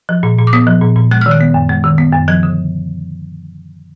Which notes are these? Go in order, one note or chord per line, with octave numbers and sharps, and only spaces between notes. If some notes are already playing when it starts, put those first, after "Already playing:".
F3
A#2
A#2
D6
B3 D#6
F3
A#2
A#2
G#3 F#6
D#3 F6
F#6
B3
F#2
G#3
D#3
B3
F#2
F3 G#6
D3